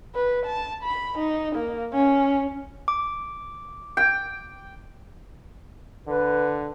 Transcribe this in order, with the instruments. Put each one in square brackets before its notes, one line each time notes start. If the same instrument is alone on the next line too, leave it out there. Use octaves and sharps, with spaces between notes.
[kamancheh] B4
A5
B5
D#4
A#3
C#4
[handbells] D6
[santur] G5
[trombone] D3 [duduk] B4